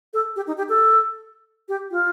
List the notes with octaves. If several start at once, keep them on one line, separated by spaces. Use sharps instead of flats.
A4
G4
D#4
G4
A4
G4
F4